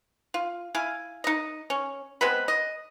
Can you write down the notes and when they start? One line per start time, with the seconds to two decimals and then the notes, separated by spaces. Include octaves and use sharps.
0.34 F4
0.75 E4 F5 G#5
1.24 D#4 D#5
1.70 C#4
2.21 G#3 B3 C4 B4
2.48 D#5